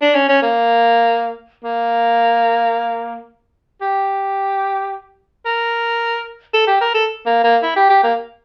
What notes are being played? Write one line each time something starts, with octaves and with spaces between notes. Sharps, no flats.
D4
C#4
C#4
A#3
A#3
G4
A#4
A4
G4
A#4
A4
A#3
A#3
E4
G4
G4
A#3